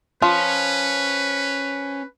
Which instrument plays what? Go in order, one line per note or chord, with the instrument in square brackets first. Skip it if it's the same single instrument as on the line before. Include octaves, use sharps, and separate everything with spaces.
[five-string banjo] F3 [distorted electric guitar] C#4 [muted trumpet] B4